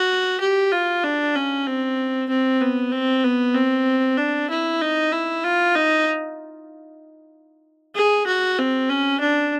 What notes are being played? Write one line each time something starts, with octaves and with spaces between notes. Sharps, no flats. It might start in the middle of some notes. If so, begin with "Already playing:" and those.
Already playing: F#4
G4
F4
D4
C#4
C4
C4
B3
C4
B3
C4
D4
E4
D#4
E4
F4
D#4
G#4
F#4
C4
C#4
D4